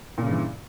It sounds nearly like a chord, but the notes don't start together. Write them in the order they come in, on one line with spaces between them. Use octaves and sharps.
A#2 C#3 G2 E3